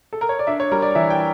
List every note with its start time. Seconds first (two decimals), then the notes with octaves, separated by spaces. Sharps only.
0.13 A4
0.21 A#4
0.29 C#5
0.39 D5
0.47 D4 E5
0.60 C#5
0.72 G3 A#4
0.82 D5
0.95 E3 E5
1.10 G5